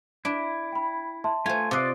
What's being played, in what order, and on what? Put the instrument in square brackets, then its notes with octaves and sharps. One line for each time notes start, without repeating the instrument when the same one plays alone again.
[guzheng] D4 [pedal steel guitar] E4 [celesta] D7
[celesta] G5 B5
E5 A5 C6
[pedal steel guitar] A3 G#5 [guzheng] F4 C5
[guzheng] C3 D#5 [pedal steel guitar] F4 D5 [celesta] D6 F#6 C7